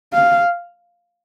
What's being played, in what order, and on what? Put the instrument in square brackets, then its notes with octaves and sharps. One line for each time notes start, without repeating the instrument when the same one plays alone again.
[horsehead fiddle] F5